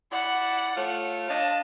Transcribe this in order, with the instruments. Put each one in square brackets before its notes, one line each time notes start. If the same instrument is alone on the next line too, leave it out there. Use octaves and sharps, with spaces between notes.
[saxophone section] E4 D5 [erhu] F#5
[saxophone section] A3 F4 C#5
[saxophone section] D4 D#5 F5 [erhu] A5